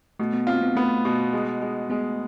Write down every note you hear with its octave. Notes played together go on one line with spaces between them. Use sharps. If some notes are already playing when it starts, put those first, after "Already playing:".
B2 A3
B3
C4 F4
B3
A3 B3
B2
G#3
G#3
G#3 B3